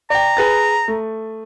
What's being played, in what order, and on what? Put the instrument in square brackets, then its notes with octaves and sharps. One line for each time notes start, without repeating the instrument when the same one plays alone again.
[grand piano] D5 G5 [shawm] A#5
[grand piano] G#4 B4 A6
A3